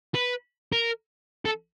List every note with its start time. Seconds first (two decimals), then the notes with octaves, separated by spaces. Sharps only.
0.14 B4
0.73 A#4
1.46 A4